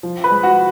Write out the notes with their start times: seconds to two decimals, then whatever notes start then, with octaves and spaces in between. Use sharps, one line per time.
0.03 F3
0.24 B4 B5
0.30 G#3
0.43 F#4 F#5